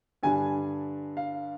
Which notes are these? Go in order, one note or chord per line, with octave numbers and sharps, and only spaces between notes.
G2 D3 G3 D4 G#5
F5